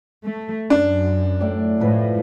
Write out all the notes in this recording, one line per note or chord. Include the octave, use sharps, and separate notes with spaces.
A3
F#2 D4
A2 D5
A2 F3 B4